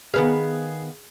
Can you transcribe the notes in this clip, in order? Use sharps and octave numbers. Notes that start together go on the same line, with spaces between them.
D#3 B3 G#4 F5